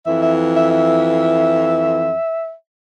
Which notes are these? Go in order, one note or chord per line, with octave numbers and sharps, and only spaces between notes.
F2 E3 E5
E5
E5
E5